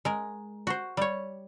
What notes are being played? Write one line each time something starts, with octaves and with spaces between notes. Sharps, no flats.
G#3 A#4
F#4 C5
G3 C#5